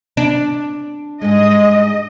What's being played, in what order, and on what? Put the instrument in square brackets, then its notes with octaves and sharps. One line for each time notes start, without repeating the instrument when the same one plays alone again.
[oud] D4
[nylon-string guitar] G#2 G3 G#3 [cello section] D#5